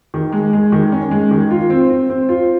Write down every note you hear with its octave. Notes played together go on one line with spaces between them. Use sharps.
D#3
G#3
G#3
D#3
C#4
G#3
D#3
F4
C4
C4
C4
F4